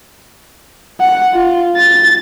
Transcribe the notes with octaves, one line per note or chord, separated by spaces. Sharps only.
F#5
F4
A6